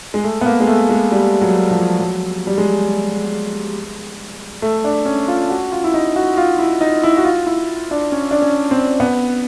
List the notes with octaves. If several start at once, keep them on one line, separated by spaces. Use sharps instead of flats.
G#3
A3
B3
A#3
G#3
A3
G#3
G3
F#3
F3
F#3
G3
G#3
A3
D4
C#4
F4
F#4
F4
E4
D#4
F#4
F4
E4
D#4
E4
F#4
F4
E4
D4
C#4
D4
C#4
C4
B3